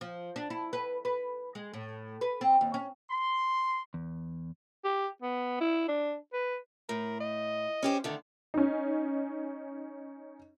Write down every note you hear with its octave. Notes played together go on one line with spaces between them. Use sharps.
F3
D4
E4
B4
B4
G#3
A2
B4
C4
D#2
C#4
C6
E2
G4
B3
E4
D4
B4
A2 A#4
D#5
C#4 G4 C5
D3 D#3 A3
C#4 D#4